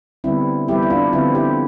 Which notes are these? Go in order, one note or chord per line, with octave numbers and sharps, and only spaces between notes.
D3 G3 B3 C4 E4
E3 G3 B3 E4 G4
E4
D4 F4
D3 F3 B3 C4 E4
E4 G4